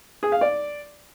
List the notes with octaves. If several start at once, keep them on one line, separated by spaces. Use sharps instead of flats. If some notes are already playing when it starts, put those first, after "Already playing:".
G#4
F5
D5